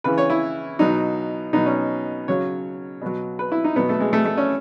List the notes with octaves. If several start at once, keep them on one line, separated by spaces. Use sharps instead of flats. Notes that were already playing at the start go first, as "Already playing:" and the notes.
C#3 E3 B4
C#5
E4
B2 F#3 D#4
B2 F#3 D#4
C#4
C#3 F#3 C#5
B2 F#3
B4
E4
D#4
B2 F#3 B3
A3
G#3
A3
A3
C#4